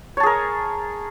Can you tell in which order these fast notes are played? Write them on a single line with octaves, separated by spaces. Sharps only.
C#5 A5 G#4 A#4